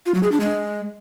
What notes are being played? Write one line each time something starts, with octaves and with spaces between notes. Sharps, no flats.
F4
F#3
G#4
D4
G#3